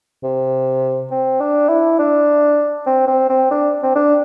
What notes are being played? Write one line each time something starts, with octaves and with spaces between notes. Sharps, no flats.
C3
C4
D4
E4
D4
C4
C4
C4
D4
C4
D4